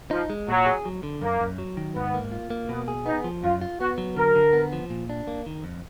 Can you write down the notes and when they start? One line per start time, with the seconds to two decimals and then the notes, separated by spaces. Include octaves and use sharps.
0.11 F3 D#4
0.30 G#3
0.48 A#2 F#3
0.66 G#4
0.85 F#3
1.03 D3
1.22 F#2 A#3
1.41 F#2
1.58 F#3
1.77 D#3
1.95 G#2 B3
2.14 A#3
2.32 F4
2.50 A#3
2.69 B2 B3
2.88 G#4
3.06 B3 D#4
3.24 F3
3.43 F#2 F4
3.61 F4
3.80 B3 F#4
3.98 F#3
4.16 D3 A#4
4.35 D3
4.53 B3
4.73 F3
4.90 A#2
5.09 D4
5.28 A#3
5.46 D#3
5.64 F2